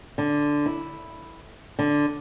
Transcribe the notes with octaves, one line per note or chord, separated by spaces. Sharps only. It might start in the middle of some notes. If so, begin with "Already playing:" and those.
D3
E4
D3